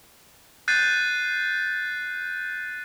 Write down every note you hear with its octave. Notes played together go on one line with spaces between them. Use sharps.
F#6 G6 A6 C7 D#7